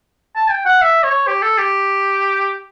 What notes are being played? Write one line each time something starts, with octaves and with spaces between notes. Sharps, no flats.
A5
G5
F#5
E5
C#5
G4
A4
G4